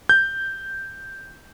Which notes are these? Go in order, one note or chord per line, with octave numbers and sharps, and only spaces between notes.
G6